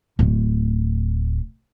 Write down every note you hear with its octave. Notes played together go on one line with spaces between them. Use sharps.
D1 A3